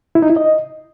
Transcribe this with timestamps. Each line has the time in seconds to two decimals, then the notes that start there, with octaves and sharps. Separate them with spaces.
0.15 E4
0.22 D#4
0.29 E4
0.37 D#5